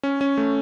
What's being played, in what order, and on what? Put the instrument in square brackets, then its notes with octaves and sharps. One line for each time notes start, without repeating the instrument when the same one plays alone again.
[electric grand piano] C#4
C#4
A3